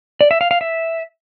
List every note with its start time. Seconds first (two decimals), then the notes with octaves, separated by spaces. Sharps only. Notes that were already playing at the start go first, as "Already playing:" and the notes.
0.21 D5
0.31 E5
0.41 F5
0.51 F5
0.61 E5